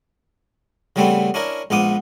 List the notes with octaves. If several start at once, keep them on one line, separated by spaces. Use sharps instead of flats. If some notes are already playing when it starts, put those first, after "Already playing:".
C#3 E3 G3 A3 B3 C4
C#4 D4 E4 A#4
A#1 G#2 B3 F4 D6 D#6